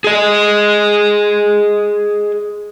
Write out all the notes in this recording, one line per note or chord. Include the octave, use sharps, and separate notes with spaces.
G#4 D#5